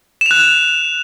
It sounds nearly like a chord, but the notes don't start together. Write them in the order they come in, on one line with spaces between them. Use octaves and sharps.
E7 F7 F#6